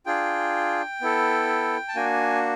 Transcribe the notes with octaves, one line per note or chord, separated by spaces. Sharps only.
D4 F4 G#4 G5
B3 E4 A4
A5
A#3 D4 F#4 G#5